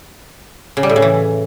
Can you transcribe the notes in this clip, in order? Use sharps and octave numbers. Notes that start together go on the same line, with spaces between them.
C#3
G3
A2
C#3
E3